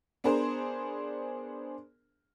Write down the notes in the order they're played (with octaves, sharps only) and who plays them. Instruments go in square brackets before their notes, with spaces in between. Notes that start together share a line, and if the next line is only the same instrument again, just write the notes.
[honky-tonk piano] B3 D4 G#4 A#4 C5